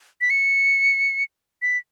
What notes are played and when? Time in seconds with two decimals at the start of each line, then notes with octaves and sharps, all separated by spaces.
0.21 B6
0.30 C#7
1.62 B6